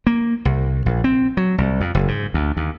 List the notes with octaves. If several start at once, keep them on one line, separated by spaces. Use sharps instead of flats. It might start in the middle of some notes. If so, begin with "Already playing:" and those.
A#3
C2
A#1
C4
F#3
C2
F2
F#1
G#2
D2
D#2